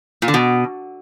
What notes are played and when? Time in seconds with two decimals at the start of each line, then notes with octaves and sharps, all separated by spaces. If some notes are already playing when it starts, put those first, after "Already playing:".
0.22 A#2
0.28 D3
0.34 B2